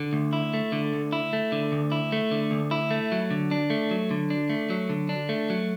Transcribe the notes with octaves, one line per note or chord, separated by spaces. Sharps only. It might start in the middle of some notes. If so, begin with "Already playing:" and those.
Already playing: D3
D2
E4
A3
D3
D2
E4
A3
D3
D2
E4
A3
D3
D2
E4
A3
F#3
D3
D4
A3
F#3
D3
D4
A3
F#3
D3
D4
A3
F#3